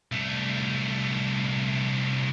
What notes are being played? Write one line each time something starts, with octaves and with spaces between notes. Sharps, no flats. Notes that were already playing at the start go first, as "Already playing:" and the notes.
C2 A3